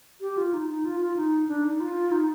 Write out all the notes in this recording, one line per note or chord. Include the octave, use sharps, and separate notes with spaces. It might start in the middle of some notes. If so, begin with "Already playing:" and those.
G4
F4
D#4
D#4
F4
F4
D#4
D4
D#4
F4
D#4